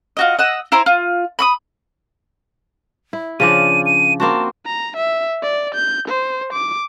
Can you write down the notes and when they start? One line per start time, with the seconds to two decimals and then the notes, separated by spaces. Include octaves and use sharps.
0.17 F4 F#4 D#5
0.39 D#5 F#5 E6
0.72 E4 C5 A#5 C6
0.86 F4
1.39 B5 C#6 D#6
3.13 E4
3.40 C#3 F3 D4 D#7
3.86 D#7
4.20 A#3 C4 F#4 A5
4.66 A#5
4.97 E5
5.42 D5
5.75 G6
6.08 C5
6.53 D6